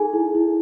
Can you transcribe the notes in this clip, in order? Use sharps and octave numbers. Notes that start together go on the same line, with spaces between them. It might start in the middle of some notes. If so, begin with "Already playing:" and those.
Already playing: D#4 G#4 A4 G#5
E4
E4